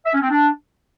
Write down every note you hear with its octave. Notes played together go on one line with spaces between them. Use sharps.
E5
C#4
C4
D4